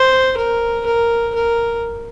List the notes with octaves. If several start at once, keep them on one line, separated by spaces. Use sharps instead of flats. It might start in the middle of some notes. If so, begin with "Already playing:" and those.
Already playing: C5
A#4
A#4
A#4